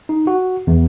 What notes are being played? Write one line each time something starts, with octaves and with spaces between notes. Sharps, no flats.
D#4
F#4
E2